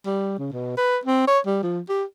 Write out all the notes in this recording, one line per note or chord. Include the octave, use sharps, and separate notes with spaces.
G3
C#3
B2
B4
C4
C#5
G3
F3
G4